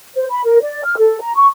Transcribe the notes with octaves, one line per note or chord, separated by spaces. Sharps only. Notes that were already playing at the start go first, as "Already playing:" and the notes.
C5
B5
A#4
D5
F6
A4
A#5
C#6